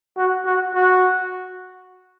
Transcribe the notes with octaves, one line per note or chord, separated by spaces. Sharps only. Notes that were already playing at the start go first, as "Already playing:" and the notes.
F#4
F#4
F#4